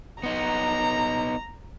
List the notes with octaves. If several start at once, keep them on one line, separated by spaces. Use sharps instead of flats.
B3 D#4 A#5